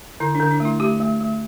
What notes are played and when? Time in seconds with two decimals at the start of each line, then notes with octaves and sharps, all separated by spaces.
0.20 D3 E4
0.35 D4
0.40 D3
0.51 D4
0.60 A3
0.65 E4
0.80 A3 G4
1.00 A3
1.20 A3